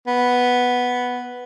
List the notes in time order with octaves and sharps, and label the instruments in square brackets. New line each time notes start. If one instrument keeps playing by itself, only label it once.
[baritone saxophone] B3